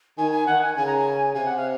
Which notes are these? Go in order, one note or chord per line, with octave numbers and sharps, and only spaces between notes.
D#3 G#5
G#5
D#3 F#5
G#5
C#3 G#5
A#5
G#5
C3 G#5
F#5
F5